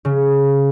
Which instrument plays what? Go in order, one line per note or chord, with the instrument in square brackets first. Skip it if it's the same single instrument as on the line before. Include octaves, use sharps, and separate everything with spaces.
[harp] C#3